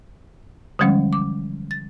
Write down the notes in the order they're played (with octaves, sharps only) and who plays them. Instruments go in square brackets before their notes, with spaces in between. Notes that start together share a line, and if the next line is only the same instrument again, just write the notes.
[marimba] D3 E3 F3 G3 G#3 C#4
D6
A6